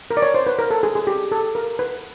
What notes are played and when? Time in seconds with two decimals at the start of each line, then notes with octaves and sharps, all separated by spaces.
0.11 A#4
0.17 D5
0.22 C#5
0.34 C5
0.47 B4
0.59 A#4
0.70 A4
0.83 G#4
0.95 G#4
1.07 G4
1.32 A4
1.55 A#4
1.79 B4